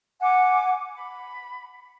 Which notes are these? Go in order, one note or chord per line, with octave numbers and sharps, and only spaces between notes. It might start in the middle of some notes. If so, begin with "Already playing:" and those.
F#5 G#5 D6
B5